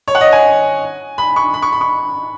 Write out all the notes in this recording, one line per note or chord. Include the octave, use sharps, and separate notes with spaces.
C#5
F#5
D#5
G#5
B5
C#6
B5
C#6
B5
C#6